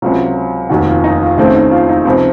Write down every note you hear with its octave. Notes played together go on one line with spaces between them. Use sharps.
C#2 C3 F#3 F4
F1 D#2 D#3 F#4
F4
D#4
F4
D#2 C#3 A3 C4 D#4
D#4
F4
D#4
C#2 C3 F3